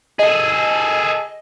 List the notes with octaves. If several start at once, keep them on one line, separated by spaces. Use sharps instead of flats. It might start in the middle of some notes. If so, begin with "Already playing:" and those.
G#4 A4 D#5